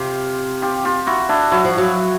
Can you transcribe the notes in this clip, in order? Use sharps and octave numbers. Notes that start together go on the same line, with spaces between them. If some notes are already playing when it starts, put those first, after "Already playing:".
Already playing: C3 F4 G4
F4 G4
F4 G4
E4 F#4
D4 E4
F#3 E4 F#4
F3
F#3